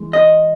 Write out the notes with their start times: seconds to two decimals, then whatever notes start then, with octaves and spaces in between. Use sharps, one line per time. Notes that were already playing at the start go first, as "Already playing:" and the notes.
Already playing: E3 G#3
0.13 D#5